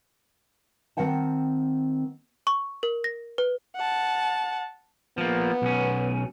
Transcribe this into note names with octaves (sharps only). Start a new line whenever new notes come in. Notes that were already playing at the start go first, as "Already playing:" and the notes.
D#3 C4 F#5 G5 A5
C#6
A#4
A#6
B4
F#5 A5
F3 A#3 B3
B1 C#4